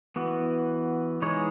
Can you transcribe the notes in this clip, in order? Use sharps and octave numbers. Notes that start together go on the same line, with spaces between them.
E3 B3 F#4
E3 G#3 D#4 G#4 C#5